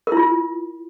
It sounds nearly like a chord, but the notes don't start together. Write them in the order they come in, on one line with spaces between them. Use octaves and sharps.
A#4 E4 F4